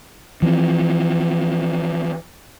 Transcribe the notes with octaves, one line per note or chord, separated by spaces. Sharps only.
E3 F3 B3 C4